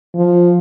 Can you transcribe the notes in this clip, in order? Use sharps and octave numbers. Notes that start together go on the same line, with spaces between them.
F3